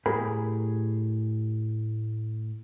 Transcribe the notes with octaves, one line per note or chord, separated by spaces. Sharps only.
A2 G4 G#4 A#4 B5